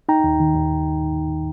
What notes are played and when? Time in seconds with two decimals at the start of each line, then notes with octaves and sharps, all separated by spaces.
0.09 D#4 G5 A#5
0.24 D#2
0.40 D#3
0.54 D#2